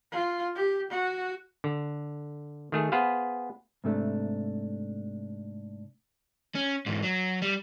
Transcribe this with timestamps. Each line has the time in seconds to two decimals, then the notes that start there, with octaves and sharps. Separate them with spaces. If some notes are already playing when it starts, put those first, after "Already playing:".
0.11 F4
0.55 G4
0.90 F#4
1.64 D3
2.72 D#3 A3 G#4
2.92 B3 G#4 B4 C5 F5
3.84 G#2 C3 A3 D4
6.55 C#4
6.86 G#2 E3
7.03 F#3
7.42 G3